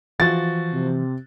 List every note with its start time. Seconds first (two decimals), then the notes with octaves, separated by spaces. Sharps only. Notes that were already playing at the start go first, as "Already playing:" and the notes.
0.20 E3 F3 F#4 A6
0.72 C3